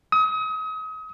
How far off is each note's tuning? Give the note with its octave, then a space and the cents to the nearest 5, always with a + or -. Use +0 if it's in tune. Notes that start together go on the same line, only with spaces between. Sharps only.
D#6 +35